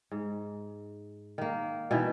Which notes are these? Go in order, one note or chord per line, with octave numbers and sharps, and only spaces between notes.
G#2
D#3 A#3
B2 D#3 E3 E4